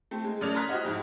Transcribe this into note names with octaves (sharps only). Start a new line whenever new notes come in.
A3 C4
G#3
F#2 A3 D5 F6 G#6 F7
A#5 C6 F6 F#6 G#6 B6
F#4 G4 C5 D#5 F#5
F2 G#2